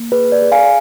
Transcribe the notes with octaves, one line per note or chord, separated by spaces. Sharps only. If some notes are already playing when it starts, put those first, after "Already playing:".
Already playing: A#3
G#4 B4
D5
G#4
F5 G#5